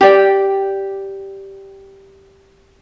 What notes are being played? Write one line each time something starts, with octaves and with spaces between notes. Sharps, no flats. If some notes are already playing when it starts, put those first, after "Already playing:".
G4 D5 G5